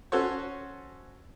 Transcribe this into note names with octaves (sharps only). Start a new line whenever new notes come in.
C#4 F#4 A4 C5 C#5